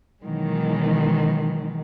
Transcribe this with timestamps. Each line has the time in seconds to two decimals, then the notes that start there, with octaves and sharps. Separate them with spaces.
0.23 B2 D#3 E3 F#3 G#3